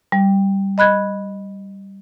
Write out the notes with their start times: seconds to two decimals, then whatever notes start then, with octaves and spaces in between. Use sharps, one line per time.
0.12 G3
0.78 D#5 B5 F#6 G#6